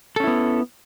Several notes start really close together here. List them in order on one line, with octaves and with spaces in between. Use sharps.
A4 C#4 E4 B3